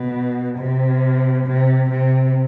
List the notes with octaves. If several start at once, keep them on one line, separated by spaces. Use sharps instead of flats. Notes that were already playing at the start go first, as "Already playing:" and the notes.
Already playing: B2
C3
C3
C3